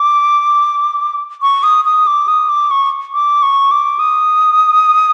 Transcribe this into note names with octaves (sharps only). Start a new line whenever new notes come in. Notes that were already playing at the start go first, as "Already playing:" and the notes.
Already playing: D6
C#6
D#6
D#6
D6
D#6
D6
C#6
D6
C#6
D6
D#6